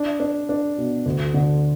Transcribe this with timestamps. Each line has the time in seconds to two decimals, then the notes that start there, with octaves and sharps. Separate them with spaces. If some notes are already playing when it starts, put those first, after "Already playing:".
Already playing: D4
0.20 D4
0.49 D4
0.78 B2
1.06 D2
1.34 D3